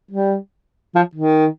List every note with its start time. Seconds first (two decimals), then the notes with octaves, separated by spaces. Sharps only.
0.11 G3
0.95 F3
1.15 D#3